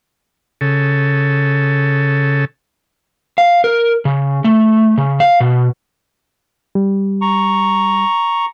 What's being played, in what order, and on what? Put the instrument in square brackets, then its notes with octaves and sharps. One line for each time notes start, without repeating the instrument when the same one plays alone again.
[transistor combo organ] C#3 A4
[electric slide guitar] F5
A#4
C#3
A3
C#3
F5
B2
[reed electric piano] G3
[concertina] A#5 C#6